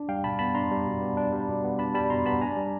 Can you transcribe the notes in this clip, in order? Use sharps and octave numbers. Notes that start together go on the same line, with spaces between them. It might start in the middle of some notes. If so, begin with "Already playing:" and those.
Already playing: D4
G3 F5 G5
B2 A5 B5
B3 A5 B5
D4 A#5 C6
G3
B2
B3
D4
G3
B2
B3
D4 A5 B5
G3 A5 B5
B2 A#5 C6
B3 A5 B5
D4 G#5 A#5
G3